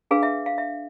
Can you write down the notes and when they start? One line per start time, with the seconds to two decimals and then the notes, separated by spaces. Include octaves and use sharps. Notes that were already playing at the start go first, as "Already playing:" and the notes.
0.11 D4 G#4 B4 F5
0.23 E5
0.46 F5
0.58 E5